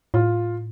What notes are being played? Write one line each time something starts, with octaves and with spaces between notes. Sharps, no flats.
A2 F4